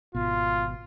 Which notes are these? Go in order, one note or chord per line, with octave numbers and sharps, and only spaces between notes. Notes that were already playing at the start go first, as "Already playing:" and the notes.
G#1 B2 F4